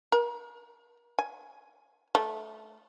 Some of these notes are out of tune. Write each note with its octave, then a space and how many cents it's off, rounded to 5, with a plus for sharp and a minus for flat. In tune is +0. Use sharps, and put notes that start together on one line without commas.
A#4 +35
G#5 +15
A3 -15